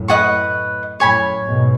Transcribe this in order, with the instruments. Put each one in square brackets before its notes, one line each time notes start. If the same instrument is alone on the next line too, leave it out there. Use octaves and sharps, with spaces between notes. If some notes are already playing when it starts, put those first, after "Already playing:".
Already playing: [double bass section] F#2 A2
[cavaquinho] B4 D#5 F#5 C#6
[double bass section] F#2 A2 [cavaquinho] C#5 G#5 B5
[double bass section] G#2 B2